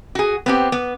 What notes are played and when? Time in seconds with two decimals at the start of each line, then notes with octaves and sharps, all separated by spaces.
0.15 F#4 G#4
0.46 B3 C4 G4
0.72 B3